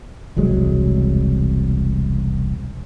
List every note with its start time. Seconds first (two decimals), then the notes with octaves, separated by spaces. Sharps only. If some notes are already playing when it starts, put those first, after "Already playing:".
0.36 E1 C2 F#3 G#3